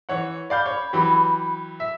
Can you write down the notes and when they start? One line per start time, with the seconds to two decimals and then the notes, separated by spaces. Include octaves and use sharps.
0.09 E3 C#5 F#5
0.50 D5 F5 B5 G6
0.66 C#5
0.93 E3 F#3 G4
1.80 E5